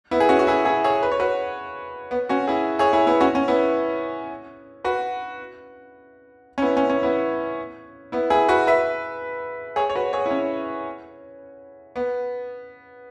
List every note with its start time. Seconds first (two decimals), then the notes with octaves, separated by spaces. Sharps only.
0.11 B3 E4
0.20 G#4
0.29 C#4 F#4
0.39 F#4
0.47 E4 G#4
0.65 E4 G#4
0.84 G#4 C#5
1.03 B4
1.11 C#5
1.20 F#4 B4
2.11 B3
2.29 C#4 F#4
2.47 E4 G#4
2.79 G#4 C#5
2.93 E4 G#4
3.07 B3 E4
3.21 C#4 F#4
3.35 C#4
3.48 B3 E4
4.84 F#4 B4
6.58 C#4
6.62 B3 E4
6.77 C#4
6.89 C#4
7.03 B3 E4
8.12 B3 E4
8.30 E4 G#4
8.49 F#4 B4
8.67 B4 E5
9.76 G#4 C#5
9.90 C#5
9.95 F#4 B4
10.13 G#4 C#5
10.26 E4
10.31 C#4
11.96 B3